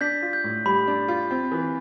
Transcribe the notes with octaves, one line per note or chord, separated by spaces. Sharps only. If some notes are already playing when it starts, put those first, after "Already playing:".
D4 G6 B6
F4
G6
A2
G3 B5
D4
F4
C4
E3